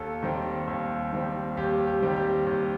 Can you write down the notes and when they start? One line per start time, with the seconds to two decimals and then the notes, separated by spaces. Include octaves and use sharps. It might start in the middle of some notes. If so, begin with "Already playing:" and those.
Already playing: D#2 A4
0.23 D#3 G3 C4
0.67 D#2
1.12 D#3 G3 C4
1.57 D#2 G4
1.87 G4
2.02 D#3 G3 C4
2.16 G4
2.47 D#2